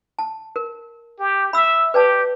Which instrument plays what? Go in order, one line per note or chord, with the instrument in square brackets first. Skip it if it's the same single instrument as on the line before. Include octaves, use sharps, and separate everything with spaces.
[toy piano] A5
A#4
[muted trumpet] G4
[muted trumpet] E5 [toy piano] B5 E6
[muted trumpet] G4 [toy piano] B4 D5 A5